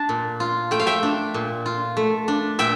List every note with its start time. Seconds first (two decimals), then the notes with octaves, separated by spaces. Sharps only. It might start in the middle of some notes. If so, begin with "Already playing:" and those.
Already playing: D4 A5
0.09 A#2
0.40 F4
0.71 A3 G5
0.80 F5
0.86 E5 G5
1.03 D4
1.34 A#2
1.66 F4
1.97 A3
2.28 D4
2.59 A#2 E5 G5